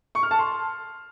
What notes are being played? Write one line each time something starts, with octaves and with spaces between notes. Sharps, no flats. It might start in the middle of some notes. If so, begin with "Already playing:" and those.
C#6
F6
A5
C6